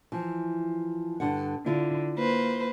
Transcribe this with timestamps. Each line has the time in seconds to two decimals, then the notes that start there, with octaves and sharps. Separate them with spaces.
0.12 E3 F3
1.20 G2 D3 F#5
1.66 D3 E4 F4
2.15 A#3 B4 C5